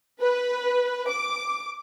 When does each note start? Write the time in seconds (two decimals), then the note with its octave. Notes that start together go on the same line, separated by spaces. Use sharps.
0.20 B4
1.09 D6